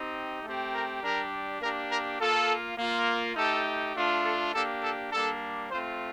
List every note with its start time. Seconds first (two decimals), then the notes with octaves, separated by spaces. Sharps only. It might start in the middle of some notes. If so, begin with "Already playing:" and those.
Already playing: C4 D#4 G4
0.43 A3 C4 G4
0.73 A#4
1.02 G3 D4 G4 A#4
1.61 A#3 D4 G4 A#4
1.90 A#4
2.19 A#3 F4 A4
2.77 A#3 F4
3.36 A3 D#4 G4 A4
3.94 A3 D4 F4
4.23 A4
4.53 A#3 D4 G4 A4
4.82 A4
5.11 G3 A#3 D4 A4
5.70 A3 C4 F4 C5